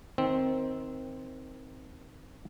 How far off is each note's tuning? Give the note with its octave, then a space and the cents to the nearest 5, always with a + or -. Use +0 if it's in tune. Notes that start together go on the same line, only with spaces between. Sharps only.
D#3 +15 C4 +0